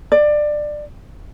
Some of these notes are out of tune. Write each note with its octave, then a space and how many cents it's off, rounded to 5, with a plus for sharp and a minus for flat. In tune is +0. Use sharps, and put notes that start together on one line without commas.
D5 +20